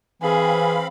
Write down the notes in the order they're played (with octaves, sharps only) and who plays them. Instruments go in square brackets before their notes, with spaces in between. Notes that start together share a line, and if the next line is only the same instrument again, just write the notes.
[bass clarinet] E3 [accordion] C4 F5 B5 [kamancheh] G#4